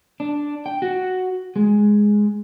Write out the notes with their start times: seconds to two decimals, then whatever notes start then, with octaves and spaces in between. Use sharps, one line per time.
0.20 D4
0.66 G5
0.82 F#4
1.56 G#3